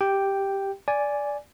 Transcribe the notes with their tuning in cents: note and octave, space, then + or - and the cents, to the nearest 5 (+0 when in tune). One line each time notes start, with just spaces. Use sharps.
G4 +0 G5 +0
D5 -10 G#5 +0